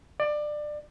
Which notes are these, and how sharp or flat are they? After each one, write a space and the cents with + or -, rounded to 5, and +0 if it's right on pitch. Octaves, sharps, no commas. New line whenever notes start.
D5 +20